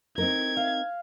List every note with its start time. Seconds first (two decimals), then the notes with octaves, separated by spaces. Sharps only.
0.18 C4 D#4 A#4 G#6
0.57 F5